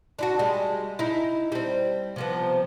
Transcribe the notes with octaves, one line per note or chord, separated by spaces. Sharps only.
D4 E4 F#4
G3 G#3
D#4 E4
G3 C4
C3 F3 B3